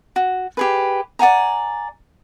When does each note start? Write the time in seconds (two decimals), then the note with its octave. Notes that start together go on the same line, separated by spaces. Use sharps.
0.16 F#4
0.57 G4 G#4 B4
1.19 D5 F#5 G#5 A#5